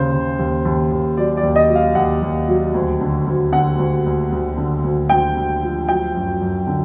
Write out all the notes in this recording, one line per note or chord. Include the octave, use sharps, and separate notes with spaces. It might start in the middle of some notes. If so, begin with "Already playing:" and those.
Already playing: D#2 C#3 C5
C#3
D#2
D#2
D#2
F#3 D5
D5
D#2
D#5
F#3
F5
D#2 F#5
D#2
F#3
D2
D3
D2
D3 F#5
D2
D2
D2
D3
D2
D2 G5
D2
F3
F#3 G5
F#2
F#2
D3